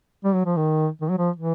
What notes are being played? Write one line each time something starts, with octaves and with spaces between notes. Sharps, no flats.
G3
F#3
F3
D#3
D#3
F#3
F3
E3